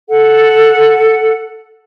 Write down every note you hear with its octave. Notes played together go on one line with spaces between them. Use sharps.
A4 F#5